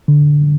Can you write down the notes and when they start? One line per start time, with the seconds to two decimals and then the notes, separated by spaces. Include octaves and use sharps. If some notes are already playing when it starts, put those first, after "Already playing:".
0.08 D3